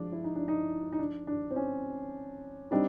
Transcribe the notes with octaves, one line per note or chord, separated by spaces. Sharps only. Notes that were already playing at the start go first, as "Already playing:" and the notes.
Already playing: F3 G#3 D4
E4
D#4
D4
D#4
D#4
D4
D4
C4
C#4
G3 C4 D4 D#4